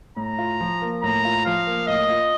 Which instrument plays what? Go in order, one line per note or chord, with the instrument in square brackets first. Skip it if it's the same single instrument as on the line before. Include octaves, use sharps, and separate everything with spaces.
[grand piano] A2 [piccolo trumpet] A#5
[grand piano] F4
F3
A#3
[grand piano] A2 [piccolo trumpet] A#5
[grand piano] F4
[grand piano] F3 [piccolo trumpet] F5
[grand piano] A#3
[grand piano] A2 [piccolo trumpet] D#5
[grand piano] F4